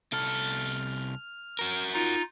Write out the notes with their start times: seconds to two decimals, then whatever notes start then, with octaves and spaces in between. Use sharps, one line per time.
0.13 C2 A4 F6
1.59 F#4 A#4
1.93 D#4 F4